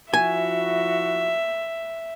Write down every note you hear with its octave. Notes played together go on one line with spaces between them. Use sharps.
F3 E4 F#4 E5 G#5